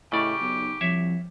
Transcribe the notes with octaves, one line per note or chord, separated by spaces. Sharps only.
A2 C#3 G4 D5 D#5
B1 D#4
C2 F3 C#5 E5